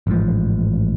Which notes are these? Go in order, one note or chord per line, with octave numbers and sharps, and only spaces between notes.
A1 G#2 F3